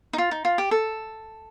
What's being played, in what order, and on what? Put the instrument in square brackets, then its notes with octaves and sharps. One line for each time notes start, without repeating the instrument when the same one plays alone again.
[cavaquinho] D#4
F4
D#4
F4
G4
A4